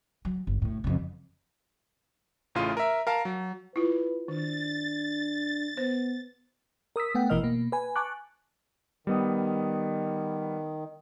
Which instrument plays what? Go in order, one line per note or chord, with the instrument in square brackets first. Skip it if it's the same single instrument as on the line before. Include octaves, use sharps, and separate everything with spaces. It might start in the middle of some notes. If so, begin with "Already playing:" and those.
[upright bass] F#3
G1
G1 A2
F2 C#3
[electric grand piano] A1 A2 C#3 F4 C6 D#7
A#4 E5
A#4 F5 A5
F#3
[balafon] E4 F4 [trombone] B4
[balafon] D#3 [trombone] D4 [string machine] A6
[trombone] B3 [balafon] C5
[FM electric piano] A#4 D#6 E6 B6
A3 B3 F#5 G5
G1 B2 E3 A#4 D#5 F6
B2 A#3
B4 G#5
G#5 A5 C#6 D6 F#6
[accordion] D#3 [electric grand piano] G3 B3 D#6